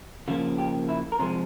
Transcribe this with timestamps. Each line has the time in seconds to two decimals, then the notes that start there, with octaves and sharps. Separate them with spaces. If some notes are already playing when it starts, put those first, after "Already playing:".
0.28 C#3 F3 A#3 F4
0.58 G4
0.89 E4
1.12 A#4
1.19 C3 F3 G#3 C5